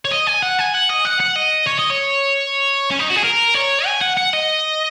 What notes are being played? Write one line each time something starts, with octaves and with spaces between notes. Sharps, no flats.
C#5
D#5
G#5
F#5
G#5
F#5
D#5
F#5
F#5
D#5
C#5
D#5
C#5
C#4
D#4
F#4
G#4
A#4
C#5
G#5
F#5
F#5
D#5